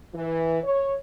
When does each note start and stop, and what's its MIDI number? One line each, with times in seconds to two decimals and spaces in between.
0.15 0.60 52
0.64 0.94 73